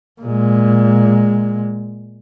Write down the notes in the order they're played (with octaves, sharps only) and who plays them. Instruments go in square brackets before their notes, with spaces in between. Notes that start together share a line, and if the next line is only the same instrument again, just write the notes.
[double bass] A#2 G#3